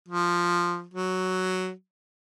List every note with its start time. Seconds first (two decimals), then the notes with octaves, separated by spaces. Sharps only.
0.08 F3
0.94 F#3